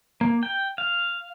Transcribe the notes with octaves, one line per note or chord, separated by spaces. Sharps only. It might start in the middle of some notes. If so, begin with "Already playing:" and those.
A#3
G5
F5